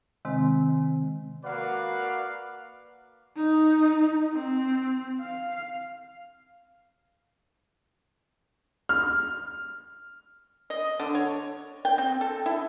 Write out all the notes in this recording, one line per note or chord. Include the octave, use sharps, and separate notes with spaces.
C3 D#3 G#3 C4
A#3 F#4 B4 D5 F5 F#5
D#4
C4
F5
F6
D#5
D3
C#5
G5
C4
A4
E4